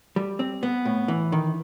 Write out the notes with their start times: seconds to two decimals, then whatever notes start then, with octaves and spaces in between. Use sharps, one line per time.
0.16 G3
0.39 C4
0.63 B3
0.85 A2
1.08 E3
1.32 D#3